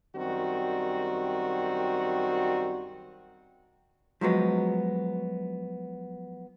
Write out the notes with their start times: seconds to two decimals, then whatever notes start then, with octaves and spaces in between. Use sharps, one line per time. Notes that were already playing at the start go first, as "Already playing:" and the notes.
0.16 F#2 D#3 G3 C4 F#4
4.21 F3 F#3 G#3 B3